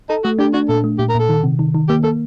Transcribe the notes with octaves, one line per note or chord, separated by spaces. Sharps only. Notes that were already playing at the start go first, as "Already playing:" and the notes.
D#4 A4
A3 F#4
D4 G4
D4 F#4
A#2 A4
A3
A#2 G4
A#4
A#2 A4
D#3
C3
D#3
D#3
A#3 G4
A#3 A4